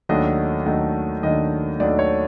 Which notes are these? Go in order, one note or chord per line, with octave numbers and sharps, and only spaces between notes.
D#2 D#3 F#3 A3 D4 D#5
D#2 D#3 F#3 A3 D4
D#2 D#3 F#3 A3 D4 D#5
D#2 D#3 F#3 A3 D4 D5
C#5